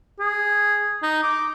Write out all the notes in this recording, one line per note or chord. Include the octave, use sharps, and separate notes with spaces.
G#4
D#4
D6